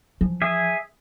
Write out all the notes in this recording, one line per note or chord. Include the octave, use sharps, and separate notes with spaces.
E3 F3
G#4 E5